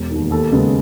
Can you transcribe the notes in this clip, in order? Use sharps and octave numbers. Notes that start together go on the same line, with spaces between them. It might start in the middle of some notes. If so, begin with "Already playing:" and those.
Already playing: E1
D#2 D#3
D#2 A4
C#3 G#3 B3